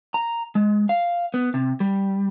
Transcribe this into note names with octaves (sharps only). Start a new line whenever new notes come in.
A#5
G#3
F5
B3
C3
G3